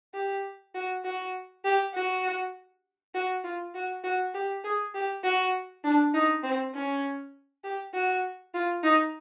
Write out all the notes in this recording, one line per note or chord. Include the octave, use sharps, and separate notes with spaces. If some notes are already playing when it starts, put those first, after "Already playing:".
G4
F#4
F#4
G4
F#4
F#4
F4
F#4
F#4
G4
G#4
G4
F#4
D4
D#4
C4
C#4
G4
F#4
F4
D#4